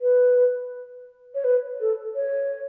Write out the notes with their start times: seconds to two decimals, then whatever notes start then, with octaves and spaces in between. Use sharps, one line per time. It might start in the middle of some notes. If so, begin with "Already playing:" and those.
0.01 B4
1.34 C#5
1.44 B4
1.80 A4
2.15 C#5